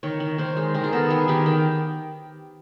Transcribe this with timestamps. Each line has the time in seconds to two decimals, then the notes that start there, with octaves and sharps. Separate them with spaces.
0.03 D#3 C#5
0.20 D#3
0.38 D#3 C5
0.57 G#3
0.74 D#3 A#4
0.84 G#4
0.93 B3 A4
1.10 D#3 G#4
1.28 D#3 G4
1.46 D#3